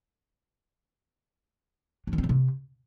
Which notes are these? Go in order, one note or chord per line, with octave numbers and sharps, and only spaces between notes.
F#3
D#3
C4
C#3
C3